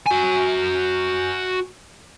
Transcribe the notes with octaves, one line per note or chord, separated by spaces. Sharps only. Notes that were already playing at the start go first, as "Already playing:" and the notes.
F#4 G#5